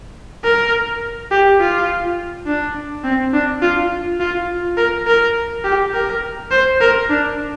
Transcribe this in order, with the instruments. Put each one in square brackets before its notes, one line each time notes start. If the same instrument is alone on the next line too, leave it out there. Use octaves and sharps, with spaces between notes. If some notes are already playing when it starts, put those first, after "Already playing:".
[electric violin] A#4
G4
F4
D4
C4
D4
F4
F4
A#4
A#4
G4
A#4
C5
A#4
D4